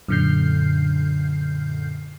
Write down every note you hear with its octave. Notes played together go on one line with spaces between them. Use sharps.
F#2 A#2 D3 F6 G6 C7